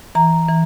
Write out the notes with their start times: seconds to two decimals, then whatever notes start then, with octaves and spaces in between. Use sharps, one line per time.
0.15 E3 A#5
0.48 E3